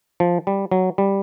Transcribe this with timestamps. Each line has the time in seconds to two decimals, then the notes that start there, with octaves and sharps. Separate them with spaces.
0.20 F3
0.47 G3
0.71 F#3
0.98 G3